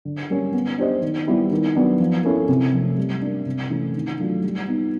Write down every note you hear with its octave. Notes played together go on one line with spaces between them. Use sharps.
D3
G3 A#3 C#4
B3
D4 G4 C5 D#5
D#3
G3 B3 E4 G4
D#3
F#3 B3 D4 F#4
F3
A#3 C#4 E4 A4
C3
F3 A3
G3
A#3 D4
C3
E3 A3 C#4
D#3
F#3 A3 D4 F4
G3
B3 D#4